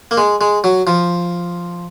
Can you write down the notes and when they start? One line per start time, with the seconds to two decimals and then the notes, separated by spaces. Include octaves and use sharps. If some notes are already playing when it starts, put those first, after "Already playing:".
0.11 A#3
0.17 G#3
0.41 G#3
0.64 F#3
0.87 F3